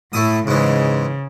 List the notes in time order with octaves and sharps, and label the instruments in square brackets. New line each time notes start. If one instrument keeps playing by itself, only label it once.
[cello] A2 [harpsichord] A3 E4 D#6
[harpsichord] G#2 E3 G#3 [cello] C#3